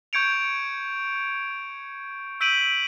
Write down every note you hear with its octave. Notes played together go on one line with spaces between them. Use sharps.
C#6 G6 G#6 C#7 D7 F7
E6 G6 B6 D7 D#7 F#7